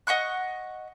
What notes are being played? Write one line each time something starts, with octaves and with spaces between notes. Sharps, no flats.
D#5 F#5 C#6 F#6